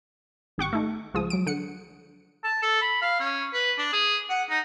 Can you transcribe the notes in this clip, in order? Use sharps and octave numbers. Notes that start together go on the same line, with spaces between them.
G#1 G4 F#5 C#6
A3 D#4
C#2 F3 G#4 D#6
F#3 D7
D3 F#5 C#7
A5
A4
B5
F5
C#4
B4
D4
G#4
F#5
D#4